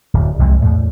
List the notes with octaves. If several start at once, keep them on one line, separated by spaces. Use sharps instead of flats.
D1
C2 F2 C3 G#3
E2 A2